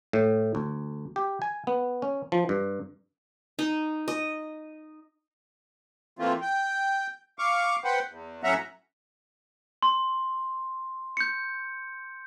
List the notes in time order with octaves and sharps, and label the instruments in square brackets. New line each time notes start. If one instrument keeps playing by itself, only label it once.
[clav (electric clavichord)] A2
D2
G4
G#5
B3
C#4
F3
G2
[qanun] D#4
D#5
[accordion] E3 A3 A#3 C4 F4
G5
F5 C#6 D6
B4 C5 F#5 G5
E2
A2 F#3 C#4 E5 F#5 A#5
[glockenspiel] C6
G6 C#7